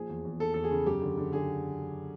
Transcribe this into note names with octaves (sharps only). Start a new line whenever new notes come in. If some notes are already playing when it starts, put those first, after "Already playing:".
Already playing: A#2 F3 G#4
E2
E2
E2 A4
E2 A4
G#4
C#3
F#2 G4
D3
D3
D3 G#4